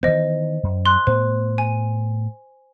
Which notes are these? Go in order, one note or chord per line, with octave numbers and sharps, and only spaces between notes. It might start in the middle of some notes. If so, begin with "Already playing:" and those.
D#3 E3 B3 C5 D#5
F#2
C6 F#6
A2 B3 C5
G#5